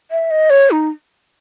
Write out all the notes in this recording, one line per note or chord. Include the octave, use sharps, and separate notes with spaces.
E5
D#5
C#5
D#4